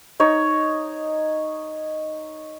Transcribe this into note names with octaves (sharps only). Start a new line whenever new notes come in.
D#4 C#5